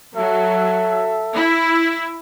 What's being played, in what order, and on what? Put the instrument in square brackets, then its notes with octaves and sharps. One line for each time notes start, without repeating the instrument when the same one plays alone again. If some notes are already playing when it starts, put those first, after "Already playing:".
[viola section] F#3 [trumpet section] A4 E5
[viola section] E4